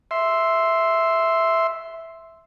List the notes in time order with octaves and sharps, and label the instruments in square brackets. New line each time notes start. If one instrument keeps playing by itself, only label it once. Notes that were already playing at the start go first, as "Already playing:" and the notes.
[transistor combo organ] E5 C6